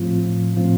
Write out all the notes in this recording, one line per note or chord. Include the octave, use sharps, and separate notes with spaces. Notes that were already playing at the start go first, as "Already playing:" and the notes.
Already playing: A2 F3 C4 F4
A2 F3 C4 F4